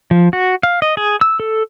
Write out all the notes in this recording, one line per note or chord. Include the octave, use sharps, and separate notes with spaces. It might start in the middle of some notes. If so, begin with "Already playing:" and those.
F3
F#4
F5
D#5
G#4
E6
A4